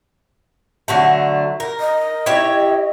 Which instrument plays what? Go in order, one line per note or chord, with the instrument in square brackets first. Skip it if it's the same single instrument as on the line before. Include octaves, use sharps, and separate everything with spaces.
[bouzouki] D3 F#3 A3
A#4
[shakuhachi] D#5
[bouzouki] E4 G4 C#5